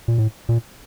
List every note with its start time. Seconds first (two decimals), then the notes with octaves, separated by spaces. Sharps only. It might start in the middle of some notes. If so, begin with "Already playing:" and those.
0.08 A#2
0.18 A2
0.49 A#2